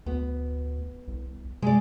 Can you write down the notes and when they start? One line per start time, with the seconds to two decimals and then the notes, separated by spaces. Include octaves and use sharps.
0.06 D2 B3
1.08 C2
1.62 C3 G#3 D5